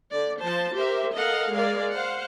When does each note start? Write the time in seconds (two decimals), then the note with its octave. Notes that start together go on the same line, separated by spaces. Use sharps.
0.12 D3 D5
0.41 F3 C5 A5
0.75 G4 A#4 C5 E5
1.12 A4 A#4 D#5 F5 F#5
1.52 G#3 G#4 A#4 D5 F5
1.92 C5 F5 F#5